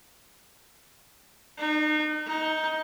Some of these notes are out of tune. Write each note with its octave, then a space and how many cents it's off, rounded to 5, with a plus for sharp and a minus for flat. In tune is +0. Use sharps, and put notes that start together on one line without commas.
D#4 -35
D#4 +15